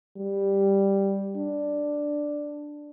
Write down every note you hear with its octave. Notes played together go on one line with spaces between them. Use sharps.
G3
D4